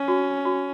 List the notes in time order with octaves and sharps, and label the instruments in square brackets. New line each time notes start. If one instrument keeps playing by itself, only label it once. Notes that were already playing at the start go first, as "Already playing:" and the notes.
Already playing: [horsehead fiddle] C#4
[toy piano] F#4
F#4